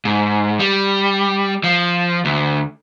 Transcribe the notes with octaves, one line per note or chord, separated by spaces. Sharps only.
G#2
G3
F3
D2